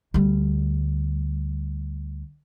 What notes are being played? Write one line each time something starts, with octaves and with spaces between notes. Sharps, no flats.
D2 G3